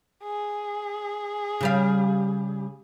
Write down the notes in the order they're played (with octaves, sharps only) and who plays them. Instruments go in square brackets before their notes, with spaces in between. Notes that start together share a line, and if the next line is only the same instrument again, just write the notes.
[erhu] G#4
[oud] C#3 G3 F5